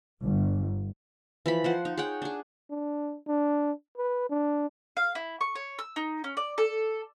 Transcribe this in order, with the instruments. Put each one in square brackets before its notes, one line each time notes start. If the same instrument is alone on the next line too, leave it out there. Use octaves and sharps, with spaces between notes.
[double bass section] G1
[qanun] E3 F3 B5
F3 C5 F#5
D#4
G#4 C#5 F#5 G5
D4 G#4
[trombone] D4
D4
B4
D4
[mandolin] F5
E4
C#6
C#5
E6
D#4
C#4
D5
A4